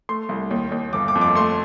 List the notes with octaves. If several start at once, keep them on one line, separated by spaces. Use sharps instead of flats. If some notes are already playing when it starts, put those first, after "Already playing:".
A3 C6
C2
D#2
D#2
G1 D6
D6
F2
D6
A3 C6